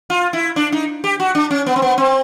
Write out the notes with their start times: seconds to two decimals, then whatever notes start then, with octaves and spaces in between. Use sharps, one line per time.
0.10 F4
0.33 E4
0.56 D4
0.72 D#4
1.04 G4
1.20 F#4
1.35 D4
1.51 C#4
1.66 B3
1.76 C4
1.82 B3
1.98 C4